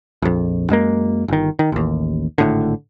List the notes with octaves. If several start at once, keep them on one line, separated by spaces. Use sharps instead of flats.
A#1 F2
F#2 G#3 A#3
G1 D#3
D#3
A1 D#2
G#1 A2 D3